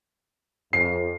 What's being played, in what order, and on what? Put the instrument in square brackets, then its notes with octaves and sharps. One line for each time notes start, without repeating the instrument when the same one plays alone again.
[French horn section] F2 [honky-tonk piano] C7